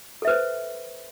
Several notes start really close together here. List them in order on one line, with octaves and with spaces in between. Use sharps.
A4 E5 B4 C5